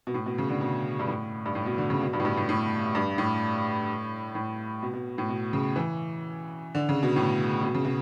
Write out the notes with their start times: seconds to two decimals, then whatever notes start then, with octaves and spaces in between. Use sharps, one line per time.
0.07 B2
0.14 A2
0.26 B2
0.38 C#3
0.50 D3
0.61 B2
0.99 G2
1.08 A2
1.46 G2
1.55 A2
1.66 B2
1.78 D3
1.90 C#3
2.02 B2
2.13 G2
2.20 A2
2.25 G2
2.37 A2
2.49 A2
2.95 G2
3.18 A2
4.35 A2
4.83 B2
4.94 B2
5.18 A2
5.29 B2
5.53 C#3
5.76 E3
6.75 D3
6.89 C#3
7.03 B2
7.16 A2
7.63 B2
7.75 C#3
7.85 B2